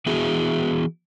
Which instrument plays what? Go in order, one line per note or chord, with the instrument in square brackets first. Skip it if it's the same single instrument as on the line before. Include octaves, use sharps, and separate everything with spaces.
[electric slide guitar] E3 B3 E4 F#4 G#4